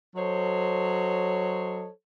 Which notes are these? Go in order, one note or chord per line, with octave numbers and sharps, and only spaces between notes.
F#3 A4 C5 C#5 D#5